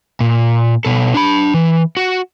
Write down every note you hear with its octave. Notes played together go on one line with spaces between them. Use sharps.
A#2
B2 A4
D4 B5
E3
F#4